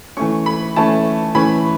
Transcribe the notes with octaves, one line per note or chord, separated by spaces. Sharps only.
E3 A3 C#4 C#6
B5
E3 A3 C#4 A5
E3 A3 C#4 B5